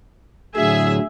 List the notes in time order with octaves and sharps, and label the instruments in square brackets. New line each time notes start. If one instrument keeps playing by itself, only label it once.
[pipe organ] A2 D3 F#3 [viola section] G#4 E5